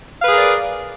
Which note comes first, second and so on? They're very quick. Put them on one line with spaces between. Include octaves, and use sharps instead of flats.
F5 B4 G#4 A#4 D5